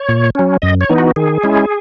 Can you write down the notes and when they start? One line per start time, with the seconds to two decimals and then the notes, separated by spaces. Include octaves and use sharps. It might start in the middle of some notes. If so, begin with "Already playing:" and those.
Already playing: C#5
0.09 A#2
0.35 F#3 C#4
0.62 F#2 D#5
0.81 C#5
0.89 E3 B3 D#4
0.98 F#4
1.16 D#3 G#4
1.44 G#3 C#4 E4